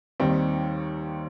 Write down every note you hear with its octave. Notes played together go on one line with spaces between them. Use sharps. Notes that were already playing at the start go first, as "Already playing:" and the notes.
D#2 D#3 G3 C4